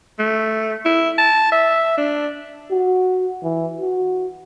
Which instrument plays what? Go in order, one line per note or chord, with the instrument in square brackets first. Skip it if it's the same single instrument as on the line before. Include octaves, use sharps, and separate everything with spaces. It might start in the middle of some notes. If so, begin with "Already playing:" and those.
[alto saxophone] A3
E4
A5
E5
D4
[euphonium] F#4
E3
F#4